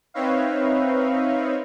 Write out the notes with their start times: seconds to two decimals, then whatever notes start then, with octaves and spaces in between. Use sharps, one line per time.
0.14 C4 D#4 B4 C#5 E5 F5